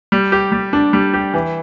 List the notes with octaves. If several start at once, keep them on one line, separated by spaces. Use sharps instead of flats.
G3
G4
G3
D4
G3
G4
E3